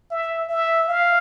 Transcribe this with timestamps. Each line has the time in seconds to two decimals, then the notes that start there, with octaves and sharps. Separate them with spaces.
0.11 E5
0.49 E5
0.88 F5